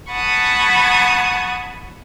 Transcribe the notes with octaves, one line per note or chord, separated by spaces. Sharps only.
F#5 G#5 A5 B5 C#6 D#6